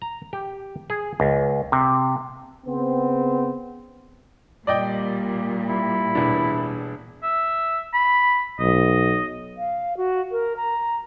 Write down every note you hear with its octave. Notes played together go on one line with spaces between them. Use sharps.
A#5
G4
G#4
C#2
C3
C#3 B3 C4
A#2 G3 D5 D#5 G5
E4
E1 E3 D4
E5
B5
B1 D#5
F5
F#4
A#4
A#5